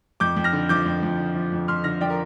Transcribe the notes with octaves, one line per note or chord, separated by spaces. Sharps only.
F2 D6 G6
F2
F6 A#6
D3
F3 D6 G6
F2
F2
D3
F3
F2
F2 C6 F6
D3 F6 A#6
F3 D5 G5
A#4